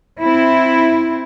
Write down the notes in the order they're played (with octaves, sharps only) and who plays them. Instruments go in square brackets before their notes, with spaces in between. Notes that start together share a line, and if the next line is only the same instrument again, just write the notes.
[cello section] C4 E4